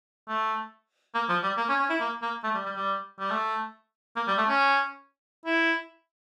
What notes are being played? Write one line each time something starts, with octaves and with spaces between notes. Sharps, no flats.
A3
A#3
F3
G3
A#3
C#4
C#4
E4
A#3
A#3
A3
G3
G3
G3
G3
A3
A#3
G3
A3
C#4
E4